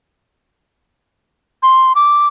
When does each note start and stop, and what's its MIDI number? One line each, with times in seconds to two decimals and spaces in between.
1.63 1.93 84
1.95 2.28 86